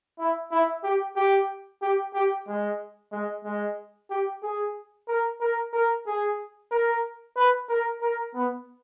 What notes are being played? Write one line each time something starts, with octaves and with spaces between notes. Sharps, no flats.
E4
E4
G4
G4
G4
G4
G#3
G#3
G#3
G4
G#4
A#4
A#4
A#4
G#4
A#4
B4
A#4
A#4
B3